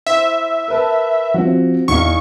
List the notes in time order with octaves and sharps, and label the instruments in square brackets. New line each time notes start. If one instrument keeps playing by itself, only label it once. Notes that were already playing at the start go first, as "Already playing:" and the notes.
[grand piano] E4 C5 [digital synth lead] E5
[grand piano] A#4 B4 A5
[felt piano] F3 C4 [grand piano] F#4
[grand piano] E2 D#4 F5 [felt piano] E3 [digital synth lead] C#6